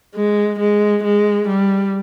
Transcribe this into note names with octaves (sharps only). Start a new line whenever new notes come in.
G#3
G#3
G#3
G3